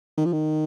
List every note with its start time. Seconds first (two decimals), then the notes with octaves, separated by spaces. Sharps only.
0.18 D#3
0.25 F3
0.33 D#3